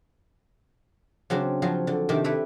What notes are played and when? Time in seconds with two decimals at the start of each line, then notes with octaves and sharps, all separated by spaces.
1.30 C#3 F#3 C4 D4
1.62 F3 F#3 F4 G#4
1.87 D3
2.09 C3 D#3 C4 D4 G4
2.24 E4 A4 B4 D5